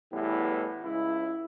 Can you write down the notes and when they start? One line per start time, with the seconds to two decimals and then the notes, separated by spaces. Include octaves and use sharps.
0.13 E2 A2 E3 G3 B3
0.83 C#2 E4